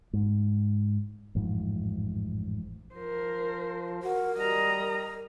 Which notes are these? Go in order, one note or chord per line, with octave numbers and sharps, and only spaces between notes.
G#2
A1 F2 G#2 F3
F3 A#4 C5
F#4 A#4
G3 D#5 A#5